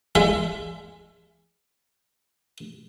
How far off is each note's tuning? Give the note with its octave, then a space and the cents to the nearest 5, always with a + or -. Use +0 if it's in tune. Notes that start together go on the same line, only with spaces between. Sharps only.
G#3 -10 E5 +25